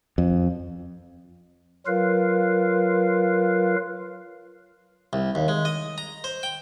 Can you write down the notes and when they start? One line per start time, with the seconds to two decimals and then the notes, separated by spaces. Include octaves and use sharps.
0.18 F2
1.87 F#3 F4 A#4 B4 F5
5.13 C2
5.35 D#2
5.48 G#3
5.65 D#5
5.98 A#5
6.24 C5
6.43 G5